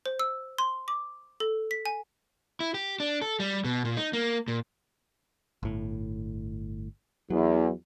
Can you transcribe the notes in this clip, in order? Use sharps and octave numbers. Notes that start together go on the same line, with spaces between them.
C5
E6
C6
D6
A4
B6
G#5
E4
G4
D4
A4
G3
B2
A#2
D#4
A#3
A#2
G1 A2
E2 F#3